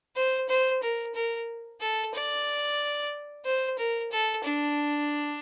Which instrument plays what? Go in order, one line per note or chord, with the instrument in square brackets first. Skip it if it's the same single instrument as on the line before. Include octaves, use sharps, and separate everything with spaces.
[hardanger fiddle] C5
C5
A#4
A#4
A4
D5
C5
A#4
A4
D4